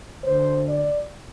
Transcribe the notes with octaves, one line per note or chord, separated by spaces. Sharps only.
D2 D3 C5
D5